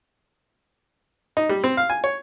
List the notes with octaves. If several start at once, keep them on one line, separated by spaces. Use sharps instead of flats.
D#4
G3
C4
F5
G#5
C#5